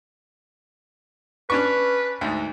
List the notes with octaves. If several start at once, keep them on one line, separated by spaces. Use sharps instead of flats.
C#4 D4 B4 C#6
D2 G#2